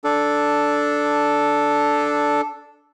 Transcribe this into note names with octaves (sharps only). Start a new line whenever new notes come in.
D4 A4